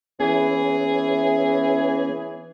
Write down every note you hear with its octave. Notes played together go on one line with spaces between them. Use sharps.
E3 B3 C#4 G#4